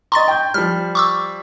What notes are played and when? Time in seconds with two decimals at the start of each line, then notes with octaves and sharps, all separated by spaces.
0.12 D#5 A#5 C6 C#6 A6
0.28 G5 G6
0.54 F3 G3 F6
0.95 C#6 D6 E6